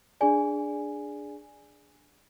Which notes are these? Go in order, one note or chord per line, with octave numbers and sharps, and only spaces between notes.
D4 G#4 D5 G#5